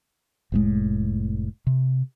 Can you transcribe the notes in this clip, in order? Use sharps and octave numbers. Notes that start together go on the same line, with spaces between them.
F1 A2 G#3
C3